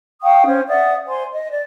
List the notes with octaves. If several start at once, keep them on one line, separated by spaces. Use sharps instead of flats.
F5 G5 C#6 D#6
C#4 C5
D5 E5 F#5 D#6
C5 G#5 C6
D#5
D5